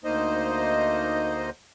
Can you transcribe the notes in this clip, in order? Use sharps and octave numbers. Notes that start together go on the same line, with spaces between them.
D2 A#3 D#4 C5 D#5